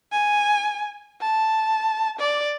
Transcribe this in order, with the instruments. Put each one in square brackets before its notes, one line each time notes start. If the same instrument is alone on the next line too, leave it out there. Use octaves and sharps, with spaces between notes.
[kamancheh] G#5
A5
D5